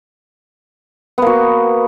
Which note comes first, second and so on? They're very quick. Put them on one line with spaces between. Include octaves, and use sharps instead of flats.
B3 A#3 F#4